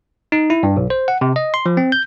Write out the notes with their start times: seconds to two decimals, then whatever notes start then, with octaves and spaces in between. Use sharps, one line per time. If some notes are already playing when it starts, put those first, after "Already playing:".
0.32 D#4
0.50 E4
0.63 G2
0.77 B1
0.90 C5
1.08 F#5
1.21 C3
1.36 D#5
1.54 C6
1.66 F3
1.77 C4
1.92 G6